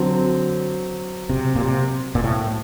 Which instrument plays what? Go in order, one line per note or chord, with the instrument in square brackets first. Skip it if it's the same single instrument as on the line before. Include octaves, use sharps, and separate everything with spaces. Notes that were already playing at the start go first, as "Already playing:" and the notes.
Already playing: [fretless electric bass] D3 [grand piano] F#3 C4
[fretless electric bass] C3
A#2
C3
A#2
A2